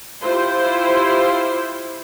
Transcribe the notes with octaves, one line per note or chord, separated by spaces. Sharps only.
E4 F4 G4 C5